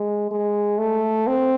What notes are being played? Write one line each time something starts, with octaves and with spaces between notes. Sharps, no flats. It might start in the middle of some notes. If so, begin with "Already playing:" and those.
Already playing: G#3
G#3
A3
C4